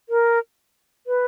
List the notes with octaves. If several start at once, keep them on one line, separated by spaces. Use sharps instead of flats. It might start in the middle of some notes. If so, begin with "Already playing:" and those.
A#4
B4